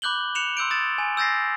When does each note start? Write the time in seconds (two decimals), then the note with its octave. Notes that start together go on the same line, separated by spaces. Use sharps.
0.02 B5 D6 F#6 G6 F#7 G7
0.35 F#6 C#7 E7 F7
0.57 C6 E6 G6 D7
0.70 D#6 A6 E7
0.98 G#5
1.17 E6 G6 A6 A#6 C7